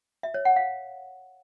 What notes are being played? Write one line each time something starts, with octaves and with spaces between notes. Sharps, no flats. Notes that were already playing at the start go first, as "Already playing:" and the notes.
E5
C#5
F#5
F5